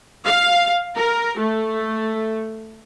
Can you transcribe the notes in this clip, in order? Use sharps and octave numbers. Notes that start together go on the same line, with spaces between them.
F5
A#4
A3